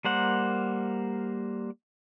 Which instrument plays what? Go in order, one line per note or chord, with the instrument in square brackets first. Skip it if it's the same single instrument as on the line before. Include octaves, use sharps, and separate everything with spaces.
[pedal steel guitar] G3 A#3 A#4 C5 F#5